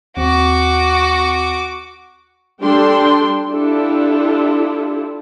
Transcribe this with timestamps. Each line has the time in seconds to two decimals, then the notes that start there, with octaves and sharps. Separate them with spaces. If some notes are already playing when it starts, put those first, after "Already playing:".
0.17 D#2 C4 F#4 D6
2.61 G3 D4 A4 G5 C6
3.50 D4 E4 F4 G4 A4